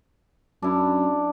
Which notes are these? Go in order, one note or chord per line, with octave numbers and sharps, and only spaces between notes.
F#2 D4 E4